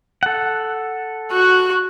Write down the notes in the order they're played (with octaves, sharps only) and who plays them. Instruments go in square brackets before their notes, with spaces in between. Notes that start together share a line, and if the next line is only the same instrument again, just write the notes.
[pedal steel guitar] A4 F#5
[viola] F#4 [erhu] F#6